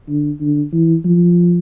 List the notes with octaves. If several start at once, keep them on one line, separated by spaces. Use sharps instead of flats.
D3
D3
E3
F3